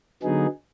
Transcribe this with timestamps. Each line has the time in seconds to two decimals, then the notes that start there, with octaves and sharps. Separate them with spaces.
0.23 D3 F#3 B3 D#4 G#4